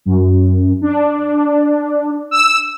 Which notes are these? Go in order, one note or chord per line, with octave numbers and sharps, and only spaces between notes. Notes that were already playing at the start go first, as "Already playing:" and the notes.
F#2
D4
E6